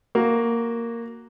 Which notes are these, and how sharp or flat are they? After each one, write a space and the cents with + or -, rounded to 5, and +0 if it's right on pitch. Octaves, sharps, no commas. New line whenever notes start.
A#3 -5 F#4 +0